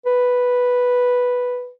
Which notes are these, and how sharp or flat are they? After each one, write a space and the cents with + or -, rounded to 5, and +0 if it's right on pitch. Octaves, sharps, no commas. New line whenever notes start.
B4 -5